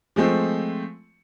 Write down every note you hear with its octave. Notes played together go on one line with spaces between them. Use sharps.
F3 G#3 A3 C4